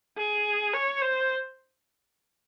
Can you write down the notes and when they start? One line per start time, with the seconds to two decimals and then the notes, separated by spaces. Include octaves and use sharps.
0.17 G#4
0.74 C#5
1.02 C5